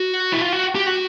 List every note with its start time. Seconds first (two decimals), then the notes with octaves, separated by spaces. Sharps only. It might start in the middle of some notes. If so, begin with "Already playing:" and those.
Already playing: F#4
0.33 E4
0.42 F4
0.52 F#4
0.75 G4
0.87 F#4